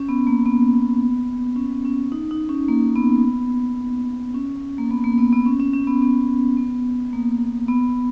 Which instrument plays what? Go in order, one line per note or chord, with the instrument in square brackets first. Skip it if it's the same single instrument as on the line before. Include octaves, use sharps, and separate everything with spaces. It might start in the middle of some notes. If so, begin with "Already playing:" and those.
Already playing: [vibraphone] C#4
B3
A#3
B3
C#4
C#4
D#4
D#4
C#4
A#3
B3
C#4
A#3
B3
A#3
B3
B3
C#4
C#4
C#4
B3
B3
B3
A#3
B3